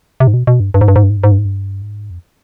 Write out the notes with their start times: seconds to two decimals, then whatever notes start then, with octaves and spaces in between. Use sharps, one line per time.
0.20 C3
0.27 G#2
0.34 B2
0.47 B2
0.60 G2
0.74 G2
0.81 G#2
0.88 G2
0.96 G#2
1.03 G2
1.10 G#2
1.17 G2
1.24 G#2
1.32 G2
1.38 G#2
1.45 G2
1.82 G#2
2.10 F2